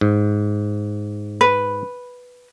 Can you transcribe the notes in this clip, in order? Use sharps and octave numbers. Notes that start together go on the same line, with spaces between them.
G#2
B4